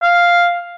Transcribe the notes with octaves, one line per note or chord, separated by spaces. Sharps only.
F5